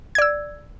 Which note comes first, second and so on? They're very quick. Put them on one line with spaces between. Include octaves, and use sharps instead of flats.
G#6 D5 E6